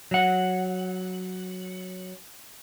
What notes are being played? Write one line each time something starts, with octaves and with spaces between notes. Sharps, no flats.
F#3 F#5